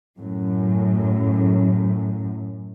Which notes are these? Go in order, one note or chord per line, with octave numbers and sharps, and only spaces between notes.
F#2 A2 F#3